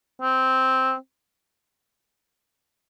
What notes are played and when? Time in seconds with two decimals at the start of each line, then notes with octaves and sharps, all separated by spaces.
0.22 C4